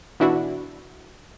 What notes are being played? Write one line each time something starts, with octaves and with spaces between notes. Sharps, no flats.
B2 E3 D4 E4 F#4